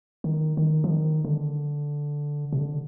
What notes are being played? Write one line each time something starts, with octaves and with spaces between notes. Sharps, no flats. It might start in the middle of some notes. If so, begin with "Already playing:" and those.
D#3
D#3
F3
D#3
D3
C3
D3